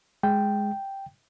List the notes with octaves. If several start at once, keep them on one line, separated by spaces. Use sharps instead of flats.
G#3 G5